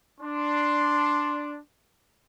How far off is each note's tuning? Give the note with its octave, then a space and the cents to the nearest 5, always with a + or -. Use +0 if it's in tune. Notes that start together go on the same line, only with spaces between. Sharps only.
D4 +0 C6 +0